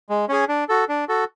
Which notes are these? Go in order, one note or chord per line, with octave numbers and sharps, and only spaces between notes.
G#3
C#4 G#4
D4
F#4 A4
D4
F#4 A4